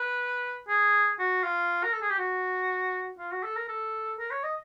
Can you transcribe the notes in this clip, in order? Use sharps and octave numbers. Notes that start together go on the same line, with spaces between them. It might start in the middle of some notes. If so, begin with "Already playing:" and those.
Already playing: B4
G#4
F#4
F4
A#4
A4
G#4
G4
F#4
F4
F#4
A4
A#4
A4
A#4
C#5
D#5